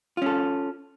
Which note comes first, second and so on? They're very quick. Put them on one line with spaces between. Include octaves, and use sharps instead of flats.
F4 C#4 A4